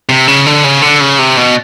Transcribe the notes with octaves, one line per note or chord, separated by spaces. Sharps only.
C3
C#3
D3
C#3
D3
C#3
C3
B2